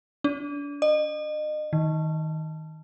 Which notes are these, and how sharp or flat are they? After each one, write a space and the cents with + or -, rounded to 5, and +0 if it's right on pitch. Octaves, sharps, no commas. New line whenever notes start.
D4 -35
D#5 -35
D#3 +20